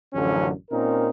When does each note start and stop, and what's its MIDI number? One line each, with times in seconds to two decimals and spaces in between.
0.13 0.50 33
0.13 0.50 42
0.13 0.50 50
0.13 0.50 53
0.13 0.50 54
0.13 0.50 61
0.71 1.09 46
0.71 1.09 60
0.71 1.09 61
0.71 1.09 63
0.71 1.09 70